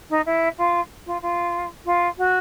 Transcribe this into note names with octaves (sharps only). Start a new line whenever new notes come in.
D#4
E4
F4
F4
F4
F4
F#4